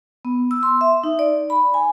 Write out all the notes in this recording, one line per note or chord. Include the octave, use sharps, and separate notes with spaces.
B3
E6
C6
E5
D#4
D5
B5
G#5